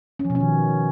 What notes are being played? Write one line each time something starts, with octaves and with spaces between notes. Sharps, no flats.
C#4
F3
B2
C#4
D#3